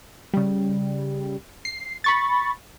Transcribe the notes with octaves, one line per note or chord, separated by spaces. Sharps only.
C#3 G3
C7
B5 C#6 A6